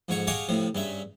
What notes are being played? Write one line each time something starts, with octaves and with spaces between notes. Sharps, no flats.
F2 G#2 C#5 F#5
G4 G#4 C#5 D#5 F5 F#5
A2 C3 F3
G2 C#3 E5